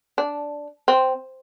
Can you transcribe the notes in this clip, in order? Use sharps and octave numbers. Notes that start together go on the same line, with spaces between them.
D4
C4